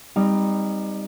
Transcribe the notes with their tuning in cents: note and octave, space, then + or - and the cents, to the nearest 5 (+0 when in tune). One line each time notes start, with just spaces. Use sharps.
G3 +15 C4 -25 D#4 -5